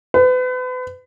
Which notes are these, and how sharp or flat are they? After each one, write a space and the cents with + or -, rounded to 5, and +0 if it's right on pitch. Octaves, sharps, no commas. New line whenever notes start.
B4 +40